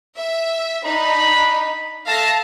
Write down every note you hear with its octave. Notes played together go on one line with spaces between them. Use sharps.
E5
D4 D#4 B5
A3 A4 E5 F5 A5 A#6